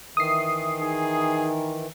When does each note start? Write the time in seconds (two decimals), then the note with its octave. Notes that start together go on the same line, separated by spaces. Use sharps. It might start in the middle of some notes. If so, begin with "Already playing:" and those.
0.17 D#3 E3 E5 D#6 C7
0.79 D#4 G#4